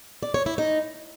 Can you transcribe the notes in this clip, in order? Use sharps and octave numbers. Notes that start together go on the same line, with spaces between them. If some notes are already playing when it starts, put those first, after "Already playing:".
D5
C#5
E4
D#4